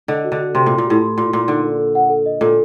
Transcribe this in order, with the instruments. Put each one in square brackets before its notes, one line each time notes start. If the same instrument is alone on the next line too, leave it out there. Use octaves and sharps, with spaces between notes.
[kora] D3 [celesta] D#5
[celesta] F#4
[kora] D3
[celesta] F#4
[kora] C3 [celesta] C6
[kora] A#2 [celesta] C6
[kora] A#2
[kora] A2 [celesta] G4
[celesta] C6
[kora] A#2 [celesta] C6
[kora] A#2 [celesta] C6
[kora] D3 [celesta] D#4
[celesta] A4
A4
F#5
A4
D#5
[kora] A#2 [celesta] A4